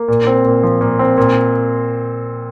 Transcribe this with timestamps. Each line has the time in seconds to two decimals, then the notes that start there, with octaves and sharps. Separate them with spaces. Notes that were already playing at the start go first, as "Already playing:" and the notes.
Already playing: A#3
0.08 A#2
0.27 C4
0.45 A#2
0.63 F3
0.81 A#2
0.99 C4
1.18 A#2